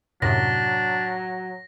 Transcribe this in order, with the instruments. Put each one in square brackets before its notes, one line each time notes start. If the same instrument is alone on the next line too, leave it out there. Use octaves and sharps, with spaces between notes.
[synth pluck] F#2 A2 C3 [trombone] F#3 [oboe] D4 [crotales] A#6